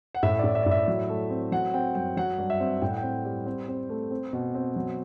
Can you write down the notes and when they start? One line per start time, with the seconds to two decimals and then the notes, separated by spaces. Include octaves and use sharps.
0.15 F#5
0.23 A2 E5
0.39 A2 D5
0.55 E5
0.63 D5
0.66 A2
0.71 E5
0.88 F#3
1.09 A3
1.30 C4
1.52 F#3 F#5
1.74 C4 G5
1.95 F#2 G5
2.17 F#3 F#5
2.38 G2
2.50 E5
2.60 C4
2.82 A2 G5
2.89 F#5
2.97 G5
3.03 C4
3.25 G3
3.46 C4
3.68 C4
3.90 A3
4.11 C4
4.33 B2
4.55 C4
4.76 F#3